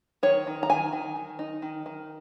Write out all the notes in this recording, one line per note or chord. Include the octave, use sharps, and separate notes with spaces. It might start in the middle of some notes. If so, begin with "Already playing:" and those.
D#3 C#5
D#3
A#5
D#3 G#5
D#3
D#3
D#4
D#3
D#3